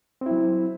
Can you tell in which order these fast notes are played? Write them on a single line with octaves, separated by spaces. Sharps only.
C4 E4 F#3